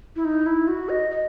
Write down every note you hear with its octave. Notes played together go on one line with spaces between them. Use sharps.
E4
D#4
E4
F#4
D#5
D#5